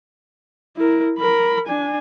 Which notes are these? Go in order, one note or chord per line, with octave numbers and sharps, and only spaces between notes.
E4 A#4
A#4 B5
D4 G#5